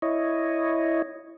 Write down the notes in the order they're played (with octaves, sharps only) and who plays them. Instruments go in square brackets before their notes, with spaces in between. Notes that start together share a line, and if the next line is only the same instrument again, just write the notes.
[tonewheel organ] E4 C#5 D#5